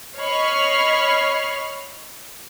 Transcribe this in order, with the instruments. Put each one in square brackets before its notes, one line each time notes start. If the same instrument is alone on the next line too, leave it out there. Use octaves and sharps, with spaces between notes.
[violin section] C#5 D#5 B5 C#6 F6 C7